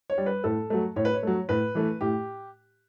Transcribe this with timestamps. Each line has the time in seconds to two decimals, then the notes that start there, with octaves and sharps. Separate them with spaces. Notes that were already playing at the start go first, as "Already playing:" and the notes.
0.10 C#5
0.18 G3
0.26 B4
0.44 A2 A4
0.70 F#3 A3
0.96 A2 C#5
1.05 B4
1.14 C#5
1.23 F#3 A3
1.49 A2 B4
1.75 E3 A3
2.01 A2 G4